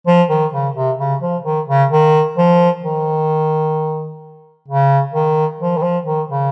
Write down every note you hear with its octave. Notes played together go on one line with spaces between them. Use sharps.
F3
D#3
C#3
C3
C#3
F3
D#3
C#3
D#3
F3
D#3
C#3
D#3
F3
D#3
F3
D#3
C#3